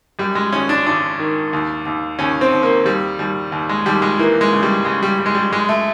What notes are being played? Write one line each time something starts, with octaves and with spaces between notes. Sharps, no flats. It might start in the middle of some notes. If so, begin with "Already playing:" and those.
F#2 G3
G#3
G#1 C#4
D4
G#1 D4
D#3
D#2
D#2
D#2 C#4
C4
D#2
A#3
D#2 G3
D#2 G3
D#2
G#3
D#2 G3
G#3
E3 A#3
G#3
C#3
G3
C#3 G#3
G3
G3
G#3
G3
F#2 G#3
A3